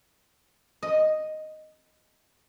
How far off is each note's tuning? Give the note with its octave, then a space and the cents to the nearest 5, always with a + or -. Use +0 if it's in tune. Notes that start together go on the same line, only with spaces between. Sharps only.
D#5 +0